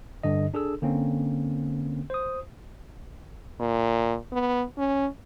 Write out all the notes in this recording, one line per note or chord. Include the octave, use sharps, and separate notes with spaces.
G2 D3 D#5
D4 G#4 A4 E6
D3 A#3 C4 C#4
C5 D#6
A#2
B3
C#4